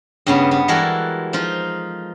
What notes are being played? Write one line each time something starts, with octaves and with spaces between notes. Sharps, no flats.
G2 C#3 B3
B3
E3 G3 G#3 F#4 A4 A#4
F3 D#4 F4